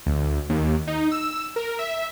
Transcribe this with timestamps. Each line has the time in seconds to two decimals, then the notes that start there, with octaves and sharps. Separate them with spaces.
0.06 D2
0.50 D#2
0.87 D#4
1.11 E6
1.56 A#4
1.79 E5